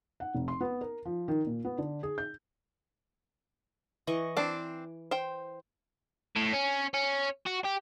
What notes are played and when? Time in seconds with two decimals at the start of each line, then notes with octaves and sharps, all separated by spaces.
0.20 F#5
0.35 F1
0.48 C6
0.61 B3
0.81 A#4
1.05 F3
1.28 D#3
1.47 A#2
1.65 B3
1.78 D3
2.03 G#4
2.18 G6
4.07 E3 D#5 C#6
4.37 C4 D4 D6
5.11 C5 G5
6.36 A2
6.53 C#4
6.94 C#4
7.46 F#4
7.65 G4